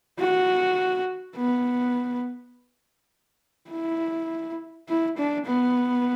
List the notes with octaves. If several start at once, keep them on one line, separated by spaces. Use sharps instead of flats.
F#4
B3
E4
E4
D4
B3